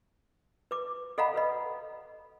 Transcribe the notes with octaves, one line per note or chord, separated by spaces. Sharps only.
B4 D6
A4 D#5 F5 F#5 A#5 B5
A4 B4 D#5